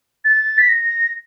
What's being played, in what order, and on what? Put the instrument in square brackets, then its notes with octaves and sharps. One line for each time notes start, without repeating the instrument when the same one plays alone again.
[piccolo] A6
B6
A#6